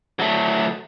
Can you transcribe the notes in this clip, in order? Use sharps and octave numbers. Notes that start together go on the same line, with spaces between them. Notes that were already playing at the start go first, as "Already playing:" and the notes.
F#3 A3